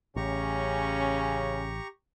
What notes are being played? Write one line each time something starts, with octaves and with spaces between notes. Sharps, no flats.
A1 C#3 C#4 G4 A#5 C#6